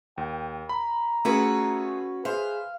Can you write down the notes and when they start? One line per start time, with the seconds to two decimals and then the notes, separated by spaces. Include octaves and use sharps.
0.18 D#2 G5
0.69 A#5 B5
1.25 A3 C#4 F4 F#4 G#4 B4
2.25 G#4 B4 C5 F5